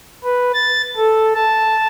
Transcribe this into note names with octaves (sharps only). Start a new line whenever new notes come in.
B4
A6
A4
A5